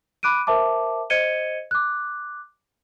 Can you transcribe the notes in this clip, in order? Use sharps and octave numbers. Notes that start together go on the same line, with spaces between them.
B5 D6 F#6 D7 D#7
A#4 C5 E5 A5 D6
C5 D#5 G#6 C#7 D#7 G7
D6 F#6